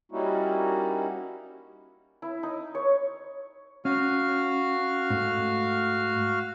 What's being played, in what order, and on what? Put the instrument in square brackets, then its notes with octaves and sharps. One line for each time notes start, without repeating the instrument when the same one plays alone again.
[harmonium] G3 A#3 C#4 D#4 E4 F#4
[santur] E4
D#4
C#5
[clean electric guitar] C#4 [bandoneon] F#4 F5 F6
[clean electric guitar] G#2 A3